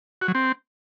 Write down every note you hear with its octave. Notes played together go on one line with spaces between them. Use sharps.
F#4
F#3
C4